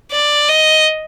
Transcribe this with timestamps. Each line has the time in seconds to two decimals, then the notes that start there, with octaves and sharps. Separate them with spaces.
0.11 D5
0.49 D#5